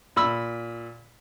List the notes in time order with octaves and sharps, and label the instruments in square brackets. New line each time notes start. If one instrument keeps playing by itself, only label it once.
[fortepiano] A#2 B5 E6